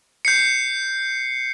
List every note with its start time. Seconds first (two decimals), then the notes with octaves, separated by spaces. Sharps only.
0.25 G6 C7 C#7